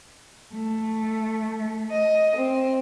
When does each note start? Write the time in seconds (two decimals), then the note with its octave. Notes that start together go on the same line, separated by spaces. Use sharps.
0.53 A3
1.91 D#5
2.37 C4